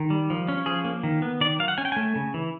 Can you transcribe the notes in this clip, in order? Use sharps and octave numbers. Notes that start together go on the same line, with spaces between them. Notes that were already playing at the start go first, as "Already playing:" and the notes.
Already playing: D#3
G3
F3
C#4
F3 G#4
A#3
D#3
B3
D#3 D5
F#3 F5
F#5
C#4 G#5
G5
A3 G#5
C#3
E3